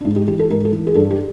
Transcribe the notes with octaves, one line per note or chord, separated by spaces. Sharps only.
D4
G#2 D#4
G4
E3 G4
A4
G#2 A#4
A4
E3
G#4
G2 A4
G4